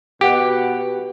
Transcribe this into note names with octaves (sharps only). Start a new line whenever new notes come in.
B2 G4 F#5